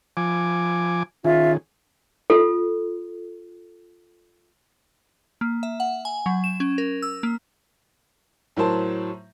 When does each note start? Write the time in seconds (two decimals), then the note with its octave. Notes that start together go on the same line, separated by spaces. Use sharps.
0.17 F3 G#5 D6
1.25 D#3 C#4 F4 G#4 E5
2.30 F4 A4
5.41 A#3
5.63 E5
5.80 F#5
6.05 G#5
6.26 F#3
6.44 E7
6.60 C#4
6.78 A#4
7.02 E6
7.23 A#3
8.57 A2 F#3 A#4 C5 A5